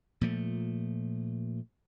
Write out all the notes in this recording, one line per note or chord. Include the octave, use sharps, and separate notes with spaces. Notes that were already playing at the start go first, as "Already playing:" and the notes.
A#2 F3 A3